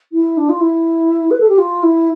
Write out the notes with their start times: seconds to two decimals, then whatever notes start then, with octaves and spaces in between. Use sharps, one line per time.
0.12 E4
0.37 D4
0.49 F4
0.61 E4
1.31 B4
1.40 A4
1.49 G4
1.58 F4
1.83 E4